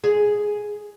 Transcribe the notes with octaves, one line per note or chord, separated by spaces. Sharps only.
G#4